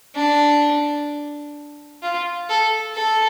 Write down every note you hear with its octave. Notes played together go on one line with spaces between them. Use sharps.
D4
F4
A4
A4